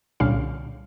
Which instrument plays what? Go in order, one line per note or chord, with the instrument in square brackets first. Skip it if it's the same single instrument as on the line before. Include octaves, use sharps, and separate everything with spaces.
[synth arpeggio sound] C2 A#2 D3 G3 C#4 F5